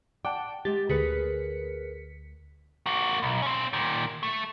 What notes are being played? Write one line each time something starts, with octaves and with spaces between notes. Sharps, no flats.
D5 F#5 G5 A5
G#3 G4 A6
D2 G#4 A#4 B4 B6 C#7
A#3 F#4
B1
C4 C#4
A#2 D#3
A3